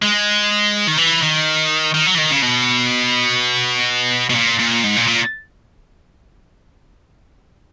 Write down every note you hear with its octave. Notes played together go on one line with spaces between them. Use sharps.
G#3
D#3
E3
D#3
D#3
F#3
E3
D#3
C#3
B2
B2
A#2
A#2
G#2
A#2
A#2